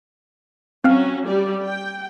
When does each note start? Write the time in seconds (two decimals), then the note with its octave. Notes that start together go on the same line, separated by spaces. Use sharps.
0.84 F#3 C4 C#4 F#4 F5 F6
1.26 G3 G4 D5
1.64 G5